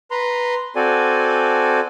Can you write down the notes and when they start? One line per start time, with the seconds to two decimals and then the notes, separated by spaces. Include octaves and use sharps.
0.11 B4 A#5 C6
0.76 C4 F#4 A4 D5 G#5